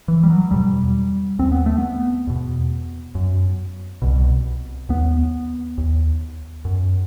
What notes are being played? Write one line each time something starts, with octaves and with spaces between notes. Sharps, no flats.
E3
G3
F#3
E2 B2 G3
D#2 C4
B3
A3
B3
E2 B2
F#2
C2 B2
D#2 B3
D#2
F#2